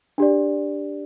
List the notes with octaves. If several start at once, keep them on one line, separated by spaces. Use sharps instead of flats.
D4 G4 D5